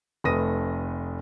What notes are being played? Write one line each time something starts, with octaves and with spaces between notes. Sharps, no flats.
F1 A3 B4 D#6 A#6 D#7